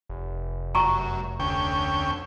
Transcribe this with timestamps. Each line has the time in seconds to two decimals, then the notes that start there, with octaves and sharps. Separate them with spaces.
0.09 F1
0.75 F#2 A#5 C#6
1.40 D2 C#4 G5